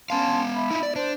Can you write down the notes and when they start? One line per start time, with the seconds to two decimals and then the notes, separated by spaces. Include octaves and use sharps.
0.10 B3 C#4 F5 A5 C6
0.55 E5 B5
0.71 D#4 E4
0.83 D5
0.96 D4 C5